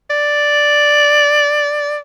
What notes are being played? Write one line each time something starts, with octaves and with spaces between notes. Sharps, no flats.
D5